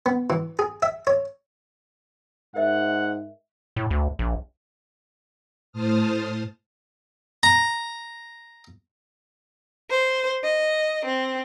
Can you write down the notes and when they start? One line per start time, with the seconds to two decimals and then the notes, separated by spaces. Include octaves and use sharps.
0.06 B3
0.30 E3
0.59 G#4
0.82 E5
1.07 C#5
2.56 G#2 A#4 D#5 E5 F#5
3.76 A2
3.91 D2
4.19 A#1
5.72 A2 C5 A5 D#6 F6
7.43 A#5
9.89 C5
10.44 D#5
11.04 C4